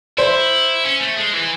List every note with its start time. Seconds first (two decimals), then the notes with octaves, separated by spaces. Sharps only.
0.18 E4 C5
0.84 C#4
1.00 A3
1.17 G#3
1.33 E3